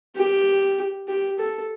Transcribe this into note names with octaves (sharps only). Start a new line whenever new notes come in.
G4
G4
A4